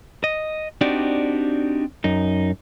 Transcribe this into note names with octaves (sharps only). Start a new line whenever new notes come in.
D#5
C4 D4 D#4 F#4 G4 D5
F#2 D#4